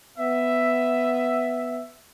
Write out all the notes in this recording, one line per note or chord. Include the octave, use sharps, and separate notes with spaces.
B3 E5